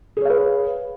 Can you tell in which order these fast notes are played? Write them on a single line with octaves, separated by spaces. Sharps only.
G#4 C#5 F5 B4